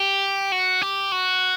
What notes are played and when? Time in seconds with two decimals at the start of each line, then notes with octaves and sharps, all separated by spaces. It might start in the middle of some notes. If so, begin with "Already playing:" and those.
Already playing: G4
0.52 F#4
0.82 G4
1.12 F#4